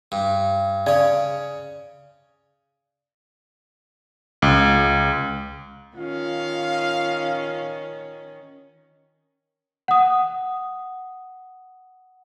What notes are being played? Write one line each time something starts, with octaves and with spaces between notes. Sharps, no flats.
G2
C#3 C#5 D5
C#2
D#3 C#4 F4 F5
F#5 D#6